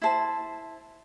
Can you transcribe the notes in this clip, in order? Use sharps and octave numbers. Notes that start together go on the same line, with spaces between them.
E4 C5 A5